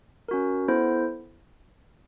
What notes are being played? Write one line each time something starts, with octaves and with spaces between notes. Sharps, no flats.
C#4 F#4 A#4
B3 E4 A4 C5